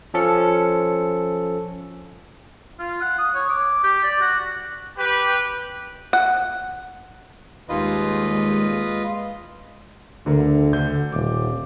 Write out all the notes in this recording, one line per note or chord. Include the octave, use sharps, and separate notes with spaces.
F3 C#4 A4 C#7
F4
F#5
D#6
C#5
D6
G4
D5
F#4
G4 B4
F#5
D#2 G3 G#3 F4 B4 D#5
D2 D3 A#4
D3 G6
D#1 D6